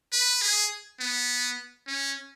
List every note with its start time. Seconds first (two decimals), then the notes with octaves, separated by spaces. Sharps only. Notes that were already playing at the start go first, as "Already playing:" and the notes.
0.13 B4
0.42 G#4
0.99 B3
1.87 C#4